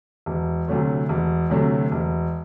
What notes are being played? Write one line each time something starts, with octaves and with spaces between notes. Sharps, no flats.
E1
D2 C3 F#3 A3
E1
D2 C3 F#3 A3
E1